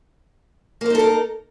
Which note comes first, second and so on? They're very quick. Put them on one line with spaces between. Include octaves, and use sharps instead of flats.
A#3 C5 D#4 A4 A#4